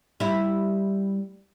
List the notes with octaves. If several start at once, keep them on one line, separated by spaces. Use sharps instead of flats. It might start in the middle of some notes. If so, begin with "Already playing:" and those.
G3 E4